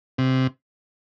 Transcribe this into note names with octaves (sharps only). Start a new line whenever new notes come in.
C3